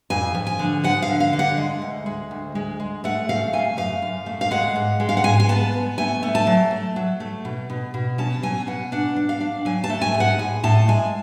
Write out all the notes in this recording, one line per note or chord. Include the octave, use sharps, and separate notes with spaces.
F2 G#5
F3
G#5
D3
F3 F#5
F5
D3
F5
D3
F#5
G#3
D2
G#3
D2
G#3
G#3
A3 F#5
C#3 F5
A3 G#5
F#2 F5
F#2
A3
F5
G#3 F#5
G#2
G#3
F5
F#5
G#2 G#5
G#5
B3 A5
B3
A3 G#5
A3
A5
F#3
A3
F#3
A3
B2
B2
B2
C#4 A5
F#3 G#5
B2 F#5
D4 F#5
D4
F5
D4
F#3 G#5
A5
A3
G#5
G#2
F#5
A2 G#5
A2 A5
G#3 G#5